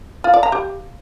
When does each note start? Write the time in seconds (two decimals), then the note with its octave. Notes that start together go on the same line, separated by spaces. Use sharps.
0.24 F4
0.34 D5
0.43 A#5
0.52 G4